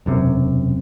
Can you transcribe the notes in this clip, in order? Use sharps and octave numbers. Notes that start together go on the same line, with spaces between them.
E1 F#2 C3